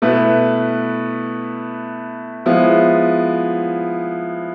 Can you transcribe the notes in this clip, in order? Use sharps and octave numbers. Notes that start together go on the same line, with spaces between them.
B2 A3 E4 B4
F3 G#3 B3 E4